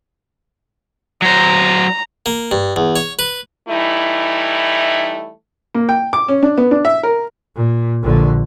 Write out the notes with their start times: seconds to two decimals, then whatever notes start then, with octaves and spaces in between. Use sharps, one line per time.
1.22 F#3 C5 A#5
2.26 A#3
2.51 G2
2.76 E2
2.96 C#5
3.19 B4
3.69 E3 G3 A3 D#4 E4
5.75 A#3
5.89 G5
6.13 D6
6.28 C#4
6.43 D4
6.58 B3
6.71 D4
6.85 E5
7.03 A#4
7.56 A#2
8.03 A#1 D3